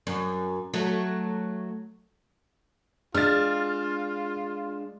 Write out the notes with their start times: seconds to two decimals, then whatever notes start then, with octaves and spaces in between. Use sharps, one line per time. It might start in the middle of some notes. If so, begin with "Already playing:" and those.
0.07 F#2
0.74 F#3 A3
3.15 G#3 D4 F4 F6 A6